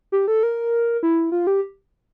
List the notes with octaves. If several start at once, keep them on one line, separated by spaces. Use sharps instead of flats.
G4
A4
A#4
E4
F4
G4